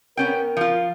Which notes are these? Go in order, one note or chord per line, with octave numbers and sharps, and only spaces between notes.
B3 C#4 A#4 G5
F3 F4